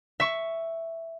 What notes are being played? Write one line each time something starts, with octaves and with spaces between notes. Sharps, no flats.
E5 C#6